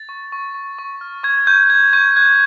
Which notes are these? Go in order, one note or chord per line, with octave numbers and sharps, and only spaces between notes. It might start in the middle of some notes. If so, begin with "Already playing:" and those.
Already playing: A6
C#6
C#6
C#6
C#6
F6
C#6 G#6
C#6 G6
G6 G#6
C#6 G6
F#6 G#6